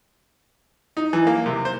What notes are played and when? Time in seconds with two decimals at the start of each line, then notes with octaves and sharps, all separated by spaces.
0.97 D#4
1.13 E3
1.27 A#3
1.46 C3
1.65 C5